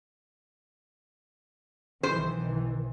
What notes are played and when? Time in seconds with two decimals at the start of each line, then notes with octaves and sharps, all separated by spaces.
2.03 B1 D#3 E3 C5